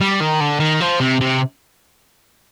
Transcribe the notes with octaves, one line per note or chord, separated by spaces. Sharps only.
G3
D#3
D3
D#3
F3
C3
C3